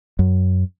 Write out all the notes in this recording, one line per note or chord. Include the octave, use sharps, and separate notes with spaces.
F#2